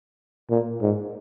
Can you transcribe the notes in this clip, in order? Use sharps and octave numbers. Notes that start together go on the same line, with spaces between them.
A#2
G#2